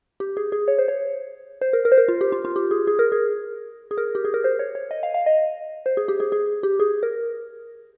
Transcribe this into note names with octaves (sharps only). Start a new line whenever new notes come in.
G4
G#4
G#4
C#5
C5
C#5
C5
A#4
A#4
C5
A#4
F4
G4
F4
F4
G4
G#4
G#4
A#4
G#4
G#4
A#4
G4
G#4
A#4
C5
C#5
C#5
D#5
F5
F5
D#5
C5
G#4
G4
G#4
G#4
G4
G#4
A#4